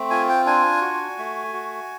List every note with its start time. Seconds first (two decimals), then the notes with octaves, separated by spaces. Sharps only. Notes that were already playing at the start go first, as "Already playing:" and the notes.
Already playing: A3 C4
0.10 F4 G#5
0.29 G5
0.46 D4 G#5
0.82 F#4
1.18 A3
1.53 F#4